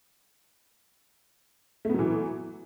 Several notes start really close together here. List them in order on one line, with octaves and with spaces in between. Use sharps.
A3 B3 F#3 E3